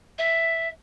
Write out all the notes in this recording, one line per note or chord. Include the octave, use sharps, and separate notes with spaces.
E5